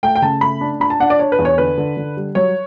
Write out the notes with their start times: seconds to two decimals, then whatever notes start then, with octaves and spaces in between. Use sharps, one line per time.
0.03 A3 G5
0.15 G5
0.22 C#3 A5
0.41 A3 B5
0.61 D4
0.80 D4 B5
0.90 A5
1.00 D4 F#5
1.10 D5
1.19 D4 C#5
1.32 B4
1.39 E2
1.45 C#5
1.58 D3 B4
1.78 D3
1.97 D3
2.17 G3
2.35 F#3 C#5